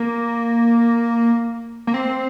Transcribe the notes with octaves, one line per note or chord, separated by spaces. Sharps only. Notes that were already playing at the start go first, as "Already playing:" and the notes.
Already playing: A#3
A#3
C4